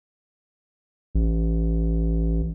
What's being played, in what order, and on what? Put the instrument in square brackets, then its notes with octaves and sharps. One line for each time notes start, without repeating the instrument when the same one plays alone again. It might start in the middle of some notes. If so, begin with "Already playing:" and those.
[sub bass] A1